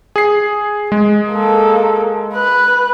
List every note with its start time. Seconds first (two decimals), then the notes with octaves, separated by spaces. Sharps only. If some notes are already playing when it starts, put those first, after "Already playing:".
0.16 G#4 C7
0.92 G#3
1.32 A#3 A4
2.34 B4 F#6